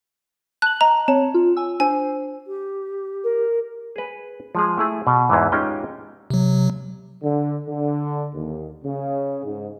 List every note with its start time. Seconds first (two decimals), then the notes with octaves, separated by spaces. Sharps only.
0.62 A5 F#6 F#7
0.81 D#5 A#5
1.08 C4 C#5 A5
1.34 F4
1.57 G#5 E6
1.80 D4 C5 G#5
2.47 G4
3.24 A#4
3.96 G#4 B4
4.55 F3 G#3 G#4
4.78 A3 E4 G#4
5.07 B2
5.29 E2 G#2 E3
5.52 G#3 C#4 D#4 F4 G4 G5
6.30 C3 F#3
7.23 D3
7.67 D3
8.35 D#2
8.83 C#3
9.45 G#2